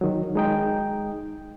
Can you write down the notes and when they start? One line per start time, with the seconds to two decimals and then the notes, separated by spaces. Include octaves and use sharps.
0.01 D#3 F#3
0.35 G#3 D#4 G5